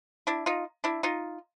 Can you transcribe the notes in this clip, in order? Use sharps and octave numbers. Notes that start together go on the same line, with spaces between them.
D4 E4
D#4 F4
D4 E4
D#4 F4